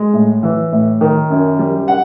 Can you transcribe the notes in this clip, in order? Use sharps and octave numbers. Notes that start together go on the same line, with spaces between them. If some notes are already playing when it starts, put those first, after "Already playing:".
Already playing: G#3
A2
E3
A2
D#3
F#2
G3
F#5